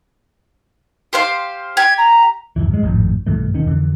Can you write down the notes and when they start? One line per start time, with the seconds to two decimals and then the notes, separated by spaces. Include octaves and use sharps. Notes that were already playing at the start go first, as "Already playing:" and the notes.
1.13 G4 C5 F5
1.77 G4 G#6
1.98 A#5
2.56 D1 C2 F#2 E3
2.71 G2 G#3
2.83 G#1 F2 A2
3.26 B1 G2 E3 A3
3.54 E1 D#3 C#4
3.67 F2 D3 E3